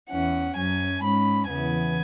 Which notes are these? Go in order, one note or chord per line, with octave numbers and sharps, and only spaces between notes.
E2 E3 C#4 F#5
F#2 F#3 C#4 G#5
G#2 G#3 C#4 B5
E2 C#3 E3 B3 G#5